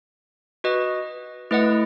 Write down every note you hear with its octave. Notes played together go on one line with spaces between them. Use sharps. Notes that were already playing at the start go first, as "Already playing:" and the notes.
F#4 B4 D#5
A3 E4 B4 D#5 F#5